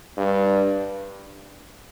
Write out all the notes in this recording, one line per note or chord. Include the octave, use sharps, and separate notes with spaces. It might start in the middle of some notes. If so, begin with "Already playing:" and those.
G2